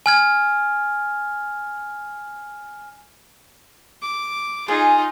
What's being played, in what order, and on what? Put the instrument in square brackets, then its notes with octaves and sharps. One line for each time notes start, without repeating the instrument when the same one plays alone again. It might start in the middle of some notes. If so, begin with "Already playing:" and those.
[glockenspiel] G#5 F6 G#6
[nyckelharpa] D6
[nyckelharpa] D#4 F4 [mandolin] G#4